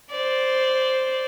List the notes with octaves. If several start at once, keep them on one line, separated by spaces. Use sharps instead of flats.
C5 D5